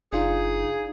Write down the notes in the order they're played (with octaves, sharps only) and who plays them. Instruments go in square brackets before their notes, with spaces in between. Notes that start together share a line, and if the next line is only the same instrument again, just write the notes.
[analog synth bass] F#1 [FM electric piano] D4 F4 [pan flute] D#4 [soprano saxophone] G#4